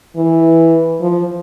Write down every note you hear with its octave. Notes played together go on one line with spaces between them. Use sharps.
E3
F3